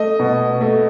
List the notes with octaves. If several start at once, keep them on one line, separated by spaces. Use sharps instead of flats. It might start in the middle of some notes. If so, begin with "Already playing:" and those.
Already playing: A3 D#5
B2
A3